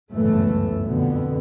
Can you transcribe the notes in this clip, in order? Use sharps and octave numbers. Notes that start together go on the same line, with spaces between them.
G1 C#2 F#2 A2 E3 A3
F2 B2 D3 B3